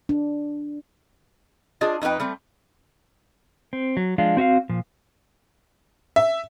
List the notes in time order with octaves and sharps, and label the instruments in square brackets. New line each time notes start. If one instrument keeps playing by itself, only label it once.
[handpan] D4
[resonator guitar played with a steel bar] D4 F4 G#4 D5 D#5
F2 D#4 F4 B4 G5
G3 A3 C4
[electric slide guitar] C4
F#3
F3 G#3 D4 F4
C4 F#4 E5 F5
A#2 F3
[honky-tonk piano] E5